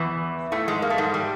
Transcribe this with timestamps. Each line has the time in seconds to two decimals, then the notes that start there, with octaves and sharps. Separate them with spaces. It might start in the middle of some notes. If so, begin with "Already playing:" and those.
Already playing: E2 E3
0.52 A2 A3
0.68 G#2 G#3
0.82 A#3
0.90 A3
0.98 G#2 G#3
1.14 G3